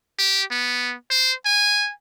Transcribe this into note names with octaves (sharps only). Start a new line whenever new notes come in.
G4
B3
C5
G#5